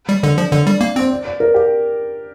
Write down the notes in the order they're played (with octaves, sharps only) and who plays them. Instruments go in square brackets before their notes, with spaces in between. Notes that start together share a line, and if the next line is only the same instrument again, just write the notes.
[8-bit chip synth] G3
[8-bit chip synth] D3 [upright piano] D4
[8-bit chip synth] F3
[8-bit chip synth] D3 [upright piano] D4
[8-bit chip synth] G3
A#3
[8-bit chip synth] C4 [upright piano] C5
[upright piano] D5
D5
A#4
G4